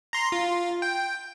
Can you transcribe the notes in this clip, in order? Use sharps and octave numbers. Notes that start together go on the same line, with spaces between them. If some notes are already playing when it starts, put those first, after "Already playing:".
A#5 C6
F4
G5